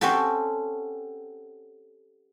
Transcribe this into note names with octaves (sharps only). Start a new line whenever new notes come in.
C4 C#4 F#4 G4 A4